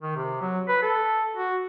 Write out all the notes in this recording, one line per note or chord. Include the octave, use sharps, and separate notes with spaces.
D#3
C3
F#3
B4
A4
F#4